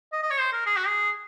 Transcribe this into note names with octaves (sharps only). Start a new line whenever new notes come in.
D#5
D#5
C#5
C5
A#4
G#4
F#4
G#4